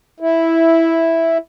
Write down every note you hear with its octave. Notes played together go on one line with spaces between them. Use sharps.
E4